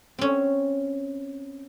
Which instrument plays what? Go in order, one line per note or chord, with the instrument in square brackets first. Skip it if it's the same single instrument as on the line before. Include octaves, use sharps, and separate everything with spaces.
[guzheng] C4 C#4